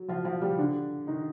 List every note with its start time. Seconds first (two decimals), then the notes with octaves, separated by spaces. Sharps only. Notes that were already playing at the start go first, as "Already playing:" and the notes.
Already playing: F#3
0.08 F3 F4
0.25 F3 F4
0.41 G3 G4
0.58 D3 D4
1.07 D#3 D#4